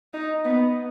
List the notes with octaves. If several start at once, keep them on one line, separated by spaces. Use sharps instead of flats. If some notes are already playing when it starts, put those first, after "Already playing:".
D#4
B3